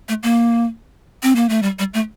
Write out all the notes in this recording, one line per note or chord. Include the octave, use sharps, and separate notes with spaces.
A3
A#3
C4
A#3
A3
G3
G3
A3